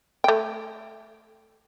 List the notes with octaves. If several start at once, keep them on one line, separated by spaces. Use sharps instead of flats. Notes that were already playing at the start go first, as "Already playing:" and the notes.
A3 G5